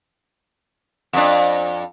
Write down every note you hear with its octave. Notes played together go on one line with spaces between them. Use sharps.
F2 D4